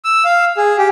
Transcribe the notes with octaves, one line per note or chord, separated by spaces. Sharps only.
E6
F5
G#4
G4